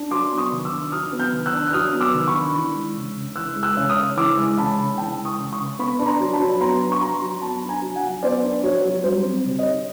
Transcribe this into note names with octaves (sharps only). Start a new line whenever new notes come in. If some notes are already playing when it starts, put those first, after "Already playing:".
Already playing: D4
F#3 C6 D6
B3
C#6 D#6
D#3
D6 E6
D4
F#3 D#6 F6
B3
F6 G6
D#3
E6 F#6
D4
F#6
F#3 D#6 F6
B3
D6 E6
D#3
B5 C#6
D4
E3
G#3
C#3
C#3
E3 E6 F#6
G#3
E6 F#6
C#3
D#6 F6
C#3
E3 D6 E6
G#3
C#3 A5 B5
C#3
E3 G5 A5
G#3
C#6 D#6
C#3
C#6 D#6
C#3
B3 B5 C#6
D4
A#5 C6
F#3
A5 B5
F#3
B3 A#5 C6
D4
C#6
F#3 A#5 C6
F#3
B3 A5 B5
D4
G#5 A#5
F#3
F#5 G#5
F#3
B3 C5 D5
D4
F#3 C#5
F#3
G3 C5
C4
D3
C#5 D#5
D#4